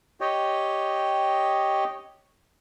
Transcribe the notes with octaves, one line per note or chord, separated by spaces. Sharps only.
G4 C#5 D#5 G5